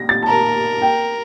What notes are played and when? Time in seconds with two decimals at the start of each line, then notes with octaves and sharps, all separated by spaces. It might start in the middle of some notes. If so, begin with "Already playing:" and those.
Already playing: A#6
0.09 A6
0.23 A5
0.27 A#4 A#5
0.82 G5